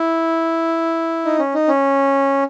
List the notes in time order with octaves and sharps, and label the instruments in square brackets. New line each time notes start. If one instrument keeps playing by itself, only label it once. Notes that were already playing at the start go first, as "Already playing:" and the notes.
Already playing: [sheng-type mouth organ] E4
D#4
C#4
D#4
C#4